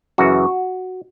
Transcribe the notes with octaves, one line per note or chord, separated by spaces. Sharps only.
F#2 C#3 E3 F#4